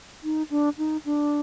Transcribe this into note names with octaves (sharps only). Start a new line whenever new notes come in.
D#4
D4
D#4
D4